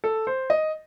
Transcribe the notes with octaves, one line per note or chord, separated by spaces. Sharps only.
A4
C5
D#5